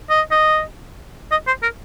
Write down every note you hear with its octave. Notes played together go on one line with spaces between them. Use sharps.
D#5
D#5
D#5
C5
A#4